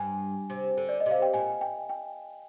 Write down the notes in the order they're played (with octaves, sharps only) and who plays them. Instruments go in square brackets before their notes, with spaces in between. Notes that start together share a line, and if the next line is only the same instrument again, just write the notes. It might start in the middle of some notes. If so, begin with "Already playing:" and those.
Already playing: [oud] G2 [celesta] G#5
[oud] C3
D3
[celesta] D5
D#5
[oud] C3
[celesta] F5
G5
[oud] A#2 [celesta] G#5
[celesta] G5
G5